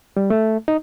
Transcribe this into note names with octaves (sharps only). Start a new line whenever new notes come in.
G3
A3
D#4